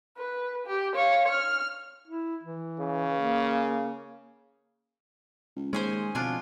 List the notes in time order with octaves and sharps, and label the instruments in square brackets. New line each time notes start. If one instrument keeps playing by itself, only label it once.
[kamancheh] B4
G4
C#5 F5
F6
[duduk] E4
E3
[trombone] C#3
[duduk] A#3
[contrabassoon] C#2
[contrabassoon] D#2 [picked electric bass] G#3 [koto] C#4 G#4 C5
[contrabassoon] F2 [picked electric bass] B2 D3 [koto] D4 F4 G#5